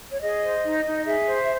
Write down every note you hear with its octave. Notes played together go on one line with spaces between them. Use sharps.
C#5
G#4 D#5
C5
D#4
D#4
G#4 E5
C5